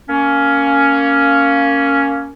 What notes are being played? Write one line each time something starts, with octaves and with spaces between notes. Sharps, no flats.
A#3 C#4